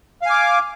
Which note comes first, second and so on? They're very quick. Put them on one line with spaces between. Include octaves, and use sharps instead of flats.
F5 G#5 D6